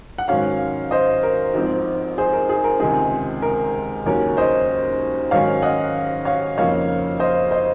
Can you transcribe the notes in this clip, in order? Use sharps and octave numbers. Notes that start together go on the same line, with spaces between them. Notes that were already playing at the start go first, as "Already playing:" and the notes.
F#5
G#2 D#3 F#3 C#4 C#5 F5
C5 D#5
A#4
G#1 G#2 F3 C4
G#4 C5
A#4
G#4
A#4
C#2 C3 D#3 G#3 C4 G#4
A#4
D#2 C#3 F#3 A#3 C#4 A#4 C#5
C5 D#5
G#2 D#3 F#3 C#4 C#5 F5
D#5 F#5
C#5 F5
F2 C#3 F3 A#3 D#4 C#5 F5
C5 D#5
C5 D#5